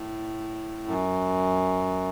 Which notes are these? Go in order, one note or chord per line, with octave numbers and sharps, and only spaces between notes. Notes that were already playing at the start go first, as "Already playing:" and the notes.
Already playing: A2
F#2